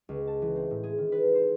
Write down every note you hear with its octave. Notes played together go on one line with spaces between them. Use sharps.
C#2
A5
E3
C4
A2
G#4
D#3
B4
C5